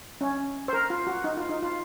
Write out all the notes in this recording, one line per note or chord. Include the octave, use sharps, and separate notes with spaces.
C#4
C5
A#4
F4
F#4
D#4
F4
D#4
F4